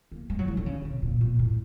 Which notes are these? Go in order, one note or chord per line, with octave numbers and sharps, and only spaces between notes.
A#3
G#3
F#3
E3
D3
C#3
C3
A#2
A#2
A2